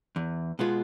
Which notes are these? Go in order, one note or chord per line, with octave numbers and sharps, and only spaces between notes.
E2
B2 G#3 B3 F4